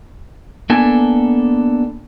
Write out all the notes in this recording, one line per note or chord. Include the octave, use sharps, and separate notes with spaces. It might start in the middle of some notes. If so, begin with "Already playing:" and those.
A#3 B3 D4 A4 G#5